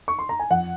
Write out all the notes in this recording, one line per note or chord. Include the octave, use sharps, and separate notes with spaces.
C#6
C6
A#5
G#5
F2 F#5